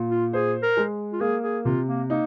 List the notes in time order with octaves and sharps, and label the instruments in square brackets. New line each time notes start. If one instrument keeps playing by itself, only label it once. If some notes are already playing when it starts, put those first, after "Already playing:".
Already playing: [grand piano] A#2
[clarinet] F4
[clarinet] G#4 [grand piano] C5
[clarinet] A#4
[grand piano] G#3
[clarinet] F4
[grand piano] A#3 [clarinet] G#4
[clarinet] G#4
[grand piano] C3 [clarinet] F4
[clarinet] A#3
[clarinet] A#3 [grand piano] D#4